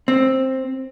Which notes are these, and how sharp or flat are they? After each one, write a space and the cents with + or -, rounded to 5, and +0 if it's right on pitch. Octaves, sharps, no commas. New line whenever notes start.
C4 +10